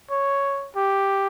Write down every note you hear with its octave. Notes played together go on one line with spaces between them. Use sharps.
C#5
G4